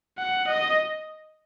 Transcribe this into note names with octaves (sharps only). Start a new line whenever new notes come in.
F#5
D#5